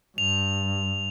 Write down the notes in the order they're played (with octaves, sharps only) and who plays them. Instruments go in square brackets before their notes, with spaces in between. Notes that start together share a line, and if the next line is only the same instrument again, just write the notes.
[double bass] G2 [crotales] F7